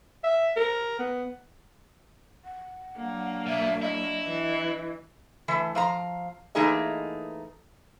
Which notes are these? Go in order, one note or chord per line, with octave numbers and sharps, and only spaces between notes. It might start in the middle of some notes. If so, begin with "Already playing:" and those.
E5
A#4
B3
F#5
F#3 A#3 D4
B2 E5
E4 D#5
E3
E3 A3
F3 F5 A#5
E3 A3 A#3 D#4 G#4 D#5